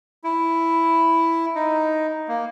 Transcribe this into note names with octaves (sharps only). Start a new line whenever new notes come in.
E4
D#4
A#3